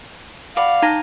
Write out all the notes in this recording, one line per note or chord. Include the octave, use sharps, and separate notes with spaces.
F#4 D5 F5 B5
D#4 G5 A5 A#5 A#6